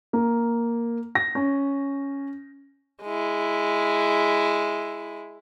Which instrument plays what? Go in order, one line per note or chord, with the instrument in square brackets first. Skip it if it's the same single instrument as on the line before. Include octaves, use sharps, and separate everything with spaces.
[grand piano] A#3
A#6
C#4
[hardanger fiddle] G#3 E4